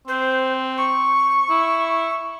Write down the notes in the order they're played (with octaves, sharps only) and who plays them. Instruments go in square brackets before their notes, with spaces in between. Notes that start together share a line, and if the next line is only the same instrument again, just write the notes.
[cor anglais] C4 [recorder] C5
[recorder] C#6
[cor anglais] E4